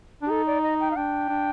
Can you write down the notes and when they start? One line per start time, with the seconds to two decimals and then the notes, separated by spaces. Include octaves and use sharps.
0.22 D4
0.26 G4
0.30 D#4 A4
0.47 D5
0.63 D#5
0.80 G5
0.91 F5
0.96 D4 G5
1.29 D4